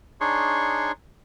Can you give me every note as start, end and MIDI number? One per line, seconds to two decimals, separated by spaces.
0.21 0.92 62
0.21 0.92 63
0.21 0.92 68
0.21 0.92 73
0.21 0.92 84
0.21 0.92 85